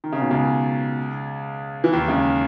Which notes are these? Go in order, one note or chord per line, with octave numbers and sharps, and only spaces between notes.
D#3
C#3
B2
C#2 C#3
E3
D#2 D#3
C#2 C#3